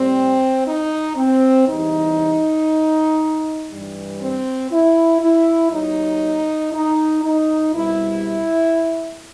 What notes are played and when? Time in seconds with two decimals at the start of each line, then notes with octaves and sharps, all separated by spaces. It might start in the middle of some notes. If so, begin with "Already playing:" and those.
Already playing: A2 G3 C4
0.66 D#4
1.17 C4
1.67 E2 C3 E3 G3 D#4
3.71 G2 E3 G3
4.21 C4
4.71 E4
5.21 E4
5.72 D#2 D#3 F#3 D#4
6.73 D#4
7.24 D#4
7.74 C2 B2 G3 E4